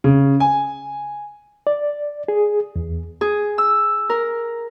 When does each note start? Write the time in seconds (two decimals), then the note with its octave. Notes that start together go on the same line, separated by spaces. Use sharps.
0.04 C#3
0.40 G#5
1.67 D5
2.28 G#4
2.76 E2
3.21 G#4
3.58 E6
4.10 A#4